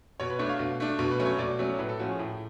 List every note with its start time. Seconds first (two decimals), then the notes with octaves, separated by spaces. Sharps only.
0.20 B2 C#5
0.30 B4
0.39 A3 D4 C#5
0.49 F5
0.59 B2
0.80 A3 D4
0.99 B2
1.11 B4
1.20 F#3 A3 C#4
1.26 C#5
1.39 B2 D5
1.59 F#3 A3 C#4
1.79 A2 B4
1.89 A4
1.99 F3 A3 C#4 F#4
2.09 G#4
2.19 A2